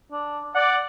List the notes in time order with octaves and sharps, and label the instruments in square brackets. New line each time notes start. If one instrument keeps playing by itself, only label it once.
[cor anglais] D4
[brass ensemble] D5 [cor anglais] F#5